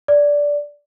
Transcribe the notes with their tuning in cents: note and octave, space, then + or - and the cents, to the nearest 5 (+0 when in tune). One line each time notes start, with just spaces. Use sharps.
D5 -10